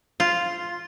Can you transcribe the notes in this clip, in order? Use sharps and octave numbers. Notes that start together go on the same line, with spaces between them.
F4